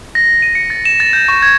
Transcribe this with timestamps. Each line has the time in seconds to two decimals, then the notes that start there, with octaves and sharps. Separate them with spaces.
0.15 A#6
0.42 D#7
0.55 C#7
0.70 A6
0.85 E7
1.00 A6
1.13 G6
1.28 C#6
1.42 G#6